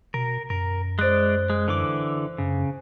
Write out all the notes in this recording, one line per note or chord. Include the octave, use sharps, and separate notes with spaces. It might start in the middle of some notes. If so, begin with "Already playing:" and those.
B2 A#4
F#2 A#4
G#3 C5 D5 F#6
G#3
D3 E3 D6
F#2 C#3